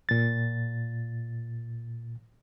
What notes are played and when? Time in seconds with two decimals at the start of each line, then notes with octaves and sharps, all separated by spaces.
0.09 A#2 A6